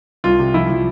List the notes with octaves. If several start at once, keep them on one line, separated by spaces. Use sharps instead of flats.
C2 F4
C3
F3 E4
F3